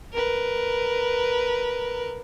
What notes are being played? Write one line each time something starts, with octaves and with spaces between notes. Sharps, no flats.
A#4 B4